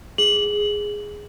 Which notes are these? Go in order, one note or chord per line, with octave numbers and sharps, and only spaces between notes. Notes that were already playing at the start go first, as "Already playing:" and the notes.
G#4 F#7